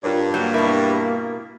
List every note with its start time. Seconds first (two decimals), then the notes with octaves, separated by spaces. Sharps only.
0.04 G2 F4 A#4 C#5
0.34 F#3 A#3 G6
0.54 B2 E4 A#4